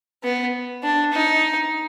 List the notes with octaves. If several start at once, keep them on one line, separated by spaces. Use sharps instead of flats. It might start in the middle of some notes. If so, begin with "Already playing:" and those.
B3
D4
D#4